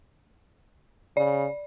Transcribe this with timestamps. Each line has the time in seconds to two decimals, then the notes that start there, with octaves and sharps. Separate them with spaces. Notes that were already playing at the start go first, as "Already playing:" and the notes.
1.17 C#3 D5